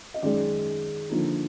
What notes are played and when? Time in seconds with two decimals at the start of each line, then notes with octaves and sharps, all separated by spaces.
0.14 D#5
0.22 F#2 D#3 G#3 D5
1.10 D3 F3 A#3 D#4